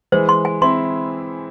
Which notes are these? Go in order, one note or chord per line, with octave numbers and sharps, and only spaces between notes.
E3 G#3 C5
C6
G#5
C4 E4 C6